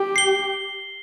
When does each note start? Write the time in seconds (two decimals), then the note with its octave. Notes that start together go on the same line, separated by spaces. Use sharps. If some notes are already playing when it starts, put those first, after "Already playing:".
Already playing: G4
0.16 C7 G7